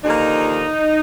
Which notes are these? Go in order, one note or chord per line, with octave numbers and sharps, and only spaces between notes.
D#2 D3 F3 A#3 D#4